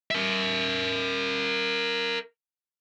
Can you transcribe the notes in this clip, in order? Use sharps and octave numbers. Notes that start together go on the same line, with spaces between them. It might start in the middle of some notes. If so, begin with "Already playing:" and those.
A#4 E5